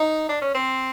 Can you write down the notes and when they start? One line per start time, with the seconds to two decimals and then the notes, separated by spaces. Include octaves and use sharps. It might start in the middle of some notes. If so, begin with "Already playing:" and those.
Already playing: D#4
0.29 D4
0.42 C#4
0.55 C4